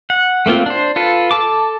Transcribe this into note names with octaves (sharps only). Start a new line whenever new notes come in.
F#5
A3 A#3 C4 F4
D4 C5
F4 A4 B4
A4 A5 D6